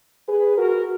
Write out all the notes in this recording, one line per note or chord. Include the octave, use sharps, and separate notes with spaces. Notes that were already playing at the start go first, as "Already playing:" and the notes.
G#4 B4
F#4 A#4